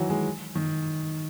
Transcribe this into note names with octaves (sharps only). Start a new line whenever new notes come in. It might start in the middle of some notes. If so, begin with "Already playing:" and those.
Already playing: D#3 E3 F#3
G#3
D#3